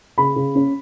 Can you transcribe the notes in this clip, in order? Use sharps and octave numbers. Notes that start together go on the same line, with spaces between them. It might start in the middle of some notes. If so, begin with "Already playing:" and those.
C#3 B5
C#3
C#4